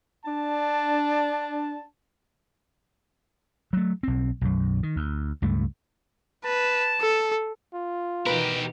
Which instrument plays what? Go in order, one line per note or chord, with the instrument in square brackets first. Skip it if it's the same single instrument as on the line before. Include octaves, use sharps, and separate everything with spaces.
[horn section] D4 A5
[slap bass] F#3 A3
B1 C4
B1 F#2
D#3
D2
C#2 G2 A3
[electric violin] B4 [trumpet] A5
[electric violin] A4
[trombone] F4
[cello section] B2 D#3 E3 [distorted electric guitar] G4 A#4 [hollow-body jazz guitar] B4